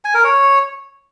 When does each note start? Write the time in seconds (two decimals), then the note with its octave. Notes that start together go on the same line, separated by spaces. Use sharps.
0.05 G#5
0.14 A#4
0.24 C#5